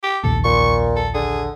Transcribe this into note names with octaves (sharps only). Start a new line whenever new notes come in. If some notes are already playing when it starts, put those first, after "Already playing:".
G4
F1 A#1 D#2 A4
A#2 C#6
A4
D3 G#4